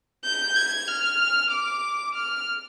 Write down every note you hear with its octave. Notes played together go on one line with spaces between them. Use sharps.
G6
G#6
F6
D6
F6